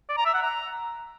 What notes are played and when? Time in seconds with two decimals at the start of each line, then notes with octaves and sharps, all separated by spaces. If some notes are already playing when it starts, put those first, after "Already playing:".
0.09 D5
0.17 A#5
0.26 E5
0.34 F#5
0.42 A#5